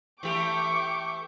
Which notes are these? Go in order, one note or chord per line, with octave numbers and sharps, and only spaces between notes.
E3 A3 G4 G5 C#6 D6